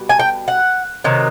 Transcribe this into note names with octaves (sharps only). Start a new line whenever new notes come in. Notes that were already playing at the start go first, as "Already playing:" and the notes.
Already playing: B2 G3
G#5
G5
F#5
C3 D#3 F#3